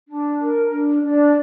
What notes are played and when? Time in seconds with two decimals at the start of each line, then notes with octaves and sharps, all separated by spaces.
0.08 D4
0.41 A#4
0.71 D4
1.03 D4 D5